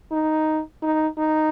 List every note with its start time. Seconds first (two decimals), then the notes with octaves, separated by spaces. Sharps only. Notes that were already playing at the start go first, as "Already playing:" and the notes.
0.12 D#4
0.83 D#4
1.18 D#4